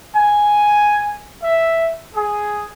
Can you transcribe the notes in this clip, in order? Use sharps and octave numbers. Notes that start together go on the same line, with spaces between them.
G#5
E5
G#4